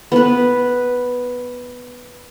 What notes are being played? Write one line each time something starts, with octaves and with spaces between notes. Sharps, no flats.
B3 B4